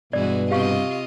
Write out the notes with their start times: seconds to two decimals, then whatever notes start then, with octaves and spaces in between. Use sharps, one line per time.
0.13 G2 B2 E3 G#3 F#4 D5
0.51 C3 F4 G4 D#5 F5 C#6